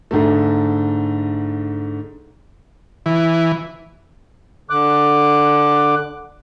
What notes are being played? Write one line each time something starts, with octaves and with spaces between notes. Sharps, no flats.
G#2 D3 A3
E3
D3 D6 F#6